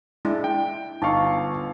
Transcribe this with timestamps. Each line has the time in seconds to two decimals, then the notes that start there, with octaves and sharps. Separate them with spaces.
0.25 G#3 D4 E4
0.44 G5
1.02 G1 D#4 F5 A5 C#6